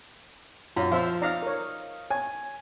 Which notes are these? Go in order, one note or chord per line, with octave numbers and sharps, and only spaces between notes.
F#2 F4
F3 C5 E5 F5
D#4 D5 F5 A#5 F6
A#4 C#5
C#5 G#5